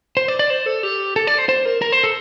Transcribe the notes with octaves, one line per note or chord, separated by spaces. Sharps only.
C5
D5
D5
C5
A4
G4
A4
D5
C5
C5
A#4
A#4
C5
A4